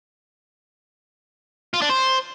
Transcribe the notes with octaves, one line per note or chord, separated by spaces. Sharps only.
F4
D4
C5